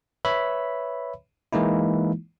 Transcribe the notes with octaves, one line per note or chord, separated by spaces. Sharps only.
B4 C#5 E5 B5
E3 G#3 A#3 D#4 E4